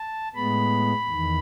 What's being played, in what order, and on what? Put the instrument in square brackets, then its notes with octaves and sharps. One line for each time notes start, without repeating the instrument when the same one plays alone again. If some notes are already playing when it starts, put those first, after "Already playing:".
Already playing: [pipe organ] A5
A2 G#3 B3 B5
E2 D#3